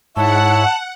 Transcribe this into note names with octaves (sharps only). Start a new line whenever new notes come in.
G#2 E4 C#5 E5 F#5 A5